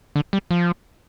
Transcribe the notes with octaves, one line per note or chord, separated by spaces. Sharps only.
D3
G3
F3